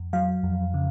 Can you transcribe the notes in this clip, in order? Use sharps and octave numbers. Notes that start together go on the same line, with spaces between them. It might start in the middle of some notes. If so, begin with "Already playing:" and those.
Already playing: F2
F#3 F5
F2
C#3